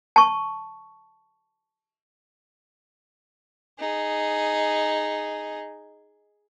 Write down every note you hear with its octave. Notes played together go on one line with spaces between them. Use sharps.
A5 C#6
D#4 G#4